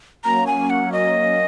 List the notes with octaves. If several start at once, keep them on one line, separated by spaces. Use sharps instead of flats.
F#3 A#3 C#4 A#5
G#5
F#5
D#5